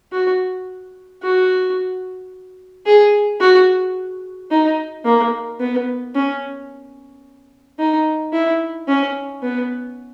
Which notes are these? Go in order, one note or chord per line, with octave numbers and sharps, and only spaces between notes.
F#4
F#4
G#4
F#4
D#4
A#3
B3
C#4
D#4
E4
C#4
B3